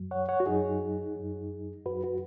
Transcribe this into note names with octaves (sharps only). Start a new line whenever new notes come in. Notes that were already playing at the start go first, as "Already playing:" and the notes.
Already playing: F#2 F#3
C#5 F#5
C#5 F#5
F#4
F#2 F#3 D#4 G#4
F#2 F#3
F#2 F#3 F#4 B4
F#4